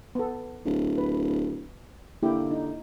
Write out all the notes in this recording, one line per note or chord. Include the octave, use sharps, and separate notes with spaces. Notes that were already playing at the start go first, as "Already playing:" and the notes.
B3 A4
D1
B4
D3 A#3 E4 G4
D#4